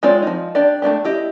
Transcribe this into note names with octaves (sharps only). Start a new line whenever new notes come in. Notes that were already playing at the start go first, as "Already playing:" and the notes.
G#3 C4 F4 C#5 D5
F3 D#4
D4 G4 D5
A3 C4 D4 G4
E4 G4 D#5